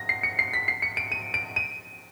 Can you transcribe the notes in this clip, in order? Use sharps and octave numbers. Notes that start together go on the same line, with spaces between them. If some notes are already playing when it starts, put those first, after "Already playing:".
Already playing: A#6
C7
C#7
C7
B6
C7
C#7
D7
D#7
D7
D#7